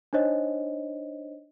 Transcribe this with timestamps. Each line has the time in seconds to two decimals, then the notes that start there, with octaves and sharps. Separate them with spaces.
0.13 D4 D#4 C5 C#5 D#5